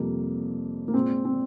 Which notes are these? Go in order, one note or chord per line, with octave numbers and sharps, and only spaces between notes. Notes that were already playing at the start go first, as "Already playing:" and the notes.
Already playing: F2 C3 G3 A#3
A#3
A#2 G#3 C4
C4